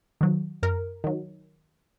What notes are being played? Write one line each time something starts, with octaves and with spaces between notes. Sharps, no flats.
D#3 F#3
F#2 A#4
D#3 F#3